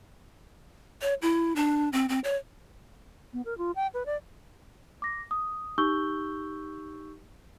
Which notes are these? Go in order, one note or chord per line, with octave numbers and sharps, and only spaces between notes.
C#5
E4
D4
C4
C4
C#5
B3
A#4
F4
G5
B4
D5
D6 A#6
D#6
D#4 G4 C#6 E6 G6 G7